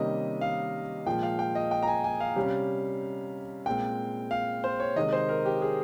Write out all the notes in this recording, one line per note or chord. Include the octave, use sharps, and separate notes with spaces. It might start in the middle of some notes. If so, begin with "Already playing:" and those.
Already playing: C3 D#3 G3 A#3 C#4 D#5
F5
A#2 F3 G#3 G5
F5
G5
D#5
G5
A#5
G#5
G#5
F5
C3 G3 C#4
A#2 G#3 C4 G5
F5
C5
C#5
C3 D#3 G#3 D#5
C5
A#4
G4
G#4